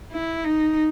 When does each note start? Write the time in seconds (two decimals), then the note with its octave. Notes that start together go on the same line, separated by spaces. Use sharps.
0.12 E4
0.44 D#4